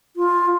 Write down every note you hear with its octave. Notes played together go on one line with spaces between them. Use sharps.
F4